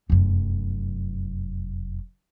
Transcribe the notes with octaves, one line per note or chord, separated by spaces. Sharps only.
F1 F#2